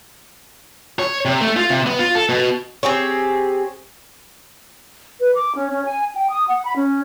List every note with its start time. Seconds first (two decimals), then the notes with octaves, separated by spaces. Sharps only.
0.99 C#5
1.25 C3
1.41 A3
1.57 F4
1.70 C3
1.86 B3
1.99 F4
2.15 A4
2.29 B2
2.83 C4 G4 G#4 C#5
5.20 B4
5.35 D6
5.56 C#4
5.72 C#4
5.85 G#5
6.14 G5
6.29 D#6
6.47 F#5
6.64 B5
6.76 C#4